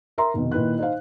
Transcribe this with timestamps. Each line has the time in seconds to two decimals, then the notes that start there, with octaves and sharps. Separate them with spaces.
0.18 A#4 E5 A#5 C6
0.34 F1 B2 D#3
0.52 A#2 D#3 E4 B4 F#6
0.79 D#4 C5 F5